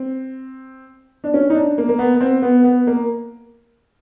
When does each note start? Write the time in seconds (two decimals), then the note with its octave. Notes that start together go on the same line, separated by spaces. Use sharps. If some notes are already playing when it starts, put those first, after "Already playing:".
Already playing: C4
1.24 D4
1.34 C#4
1.50 D#4
1.55 D4
1.78 A#3
1.89 A#3
1.99 B3
2.15 B3
2.21 C4
2.42 B3
2.64 B3
2.87 A#3